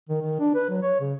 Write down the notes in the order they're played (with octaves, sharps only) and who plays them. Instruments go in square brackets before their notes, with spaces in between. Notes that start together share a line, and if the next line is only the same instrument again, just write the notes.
[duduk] D#3
D#3
D4
B4
F#3
C#5
C#3